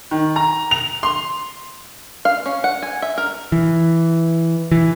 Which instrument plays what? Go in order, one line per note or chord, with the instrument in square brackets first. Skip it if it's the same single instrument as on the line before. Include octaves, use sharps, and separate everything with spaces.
[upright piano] D#3
A#5
F7
C6
[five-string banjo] F5
C#4
F#5
G#5
E5
A#4
[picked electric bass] E3
E3